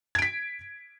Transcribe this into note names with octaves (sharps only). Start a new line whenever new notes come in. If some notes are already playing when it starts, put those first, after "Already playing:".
G#6 B6 D7